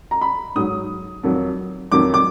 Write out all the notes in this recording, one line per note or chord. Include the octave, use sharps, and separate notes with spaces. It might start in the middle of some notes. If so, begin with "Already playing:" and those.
A#5
B5
G#2 F#3 D#6
F2 D#3 F#3
F2 D#3 F#3 D6
D6